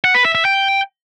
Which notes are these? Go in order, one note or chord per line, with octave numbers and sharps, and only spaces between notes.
F#5
B4
E5
E5
G5